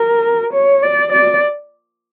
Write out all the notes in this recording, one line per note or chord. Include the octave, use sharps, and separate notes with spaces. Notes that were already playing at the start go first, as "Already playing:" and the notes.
Already playing: A#4
C#5
D5
D5